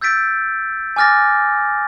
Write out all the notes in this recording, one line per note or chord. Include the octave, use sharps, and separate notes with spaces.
E6 G6 A6 B6 D7
G#5 D6 F6 A6 A#6